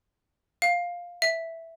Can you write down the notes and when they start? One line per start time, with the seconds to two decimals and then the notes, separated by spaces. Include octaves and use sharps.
0.62 F5
1.22 E5